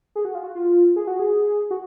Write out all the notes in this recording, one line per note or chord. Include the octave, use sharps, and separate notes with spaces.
G#4
F#4
F4
F#4
F4
G#4
F#4
G#4
F#4